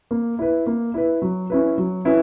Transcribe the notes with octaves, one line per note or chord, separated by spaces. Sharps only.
A#3
E4 B4
A#3
E4 B4
F#3
C#4 E4 B4
F#3
C#4 E4 B4